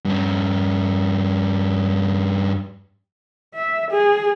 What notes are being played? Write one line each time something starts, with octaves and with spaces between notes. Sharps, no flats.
G2 C#4
E5
G#4